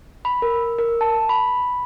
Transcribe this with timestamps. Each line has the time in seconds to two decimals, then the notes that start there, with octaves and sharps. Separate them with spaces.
0.25 B5
0.42 A#4
0.78 A#4
1.01 A5
1.29 B5